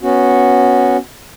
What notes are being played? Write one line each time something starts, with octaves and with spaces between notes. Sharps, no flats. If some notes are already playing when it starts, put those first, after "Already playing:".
B3 C#4 F#4